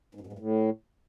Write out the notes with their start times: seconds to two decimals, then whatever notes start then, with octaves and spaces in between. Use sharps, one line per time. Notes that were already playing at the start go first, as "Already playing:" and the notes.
0.15 G#2
0.21 F#2
0.27 G#2
0.33 G2
0.39 A2